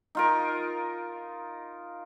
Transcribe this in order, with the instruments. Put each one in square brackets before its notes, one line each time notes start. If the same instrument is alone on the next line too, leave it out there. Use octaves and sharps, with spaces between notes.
[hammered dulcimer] D#4 F4 A#4